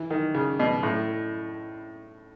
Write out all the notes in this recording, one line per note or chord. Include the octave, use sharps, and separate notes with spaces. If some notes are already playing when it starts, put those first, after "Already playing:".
Already playing: E3
D#3
C#3
B2
A2